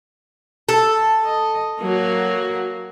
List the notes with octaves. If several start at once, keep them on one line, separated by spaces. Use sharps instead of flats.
A4
D#5
F#3 A#3 F#4